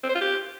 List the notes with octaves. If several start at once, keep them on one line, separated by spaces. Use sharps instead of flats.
C4
C5
F4
G4